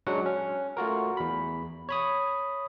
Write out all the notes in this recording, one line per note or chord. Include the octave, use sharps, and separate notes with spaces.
F#3 G#3 C#4 D4 F#4 F#5
C#4
A3 F4 F#4 A#4
E2 B5
C#5 B5 D#6